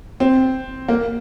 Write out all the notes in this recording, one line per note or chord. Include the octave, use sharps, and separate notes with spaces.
C4
A#3